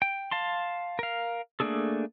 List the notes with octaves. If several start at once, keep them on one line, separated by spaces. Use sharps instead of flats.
G5
F5 A5 C6
A#4 F5
A3 A#3 D4 G#4 A4